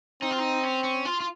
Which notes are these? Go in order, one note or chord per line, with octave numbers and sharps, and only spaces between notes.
C4 D#4
F4
D#4
C#4
C#4
F4
F4